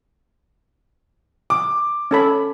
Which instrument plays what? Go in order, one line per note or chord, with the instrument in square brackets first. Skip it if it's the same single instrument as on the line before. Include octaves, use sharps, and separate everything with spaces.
[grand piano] D6
[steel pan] C#4 A4 B5